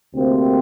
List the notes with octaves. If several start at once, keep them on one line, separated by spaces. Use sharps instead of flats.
D2 C3 A#3 C4